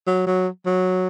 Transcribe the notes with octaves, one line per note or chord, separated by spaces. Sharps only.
F#3
F#3
F#3